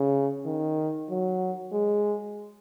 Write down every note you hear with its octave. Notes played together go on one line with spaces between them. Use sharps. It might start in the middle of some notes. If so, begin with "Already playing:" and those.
Already playing: C#3
D#3
F#3
G#3